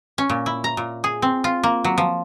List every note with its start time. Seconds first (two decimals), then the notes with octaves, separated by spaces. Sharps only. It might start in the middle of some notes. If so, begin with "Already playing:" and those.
0.18 C#4
0.29 A#2
0.46 E4
0.64 A#5
0.77 A#2
1.04 G#4
1.22 C4
1.44 F4
1.63 A#3
1.84 F#3
1.98 F3